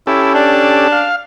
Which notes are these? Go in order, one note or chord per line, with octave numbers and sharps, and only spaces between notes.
C#4 E4 G4 A4
D4
F5